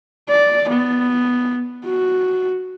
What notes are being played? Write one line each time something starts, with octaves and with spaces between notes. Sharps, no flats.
D5
B3
F#4